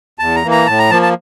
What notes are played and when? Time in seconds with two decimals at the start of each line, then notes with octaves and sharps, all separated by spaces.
0.19 E2 A5
0.36 A#5
0.43 E3 A#3
0.51 A#5
0.67 A2 A5
0.79 A#5
0.90 F3 A#3 A5
1.02 A5